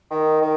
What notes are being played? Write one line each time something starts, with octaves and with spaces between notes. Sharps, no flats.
D#3
D#3